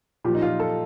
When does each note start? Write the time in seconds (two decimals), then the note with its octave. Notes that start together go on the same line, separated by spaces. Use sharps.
0.24 A#2 F3 G4
0.35 D#4
0.42 F4
0.60 A4